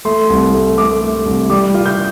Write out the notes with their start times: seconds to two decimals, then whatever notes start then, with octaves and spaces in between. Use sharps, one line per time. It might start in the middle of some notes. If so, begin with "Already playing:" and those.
0.05 A3 C6
0.30 C2
0.53 A3
0.78 A3 D6
1.01 A3
1.26 C2
1.50 G3 D6
1.74 F4
1.86 G6